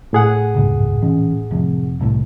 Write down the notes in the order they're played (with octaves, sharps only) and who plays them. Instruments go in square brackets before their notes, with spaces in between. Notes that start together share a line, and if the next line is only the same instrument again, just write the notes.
[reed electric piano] A2 G#4 F#5
[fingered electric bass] F#1 C#2 G#2
D#1 E3 C#4
F1 F2
E1 C2 A2